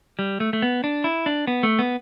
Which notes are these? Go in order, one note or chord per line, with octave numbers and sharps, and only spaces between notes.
G3
A3
A3
B3
D4
E4
D4
B3
A3
B3